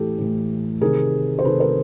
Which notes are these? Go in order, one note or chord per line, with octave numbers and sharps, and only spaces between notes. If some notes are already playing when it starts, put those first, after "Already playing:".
Already playing: A2 E3 G4 A4
A2 E3
C3 D#3 G#4 A#4
C5
C3 D#3 A4 B4
A#4 C5